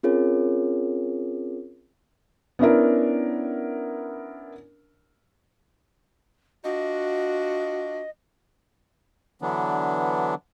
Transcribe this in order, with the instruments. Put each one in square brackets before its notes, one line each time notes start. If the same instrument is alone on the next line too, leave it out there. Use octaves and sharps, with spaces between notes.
[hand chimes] C4 C#4 F4 G#4 A#4 C#5
[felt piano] B3 C#4 D4 E4 A#4
[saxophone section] D4 F4 F#4 [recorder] D#5
[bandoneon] D3 E3 F#3 B3 D4